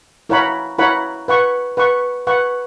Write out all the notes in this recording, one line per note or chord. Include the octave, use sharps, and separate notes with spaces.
E4 A#4 C#5 F#5 B5
E4 A#4 C#5 F#5 B5
B4 F#5 C#6
B4 F#5 C#6
B4 F#5 C#6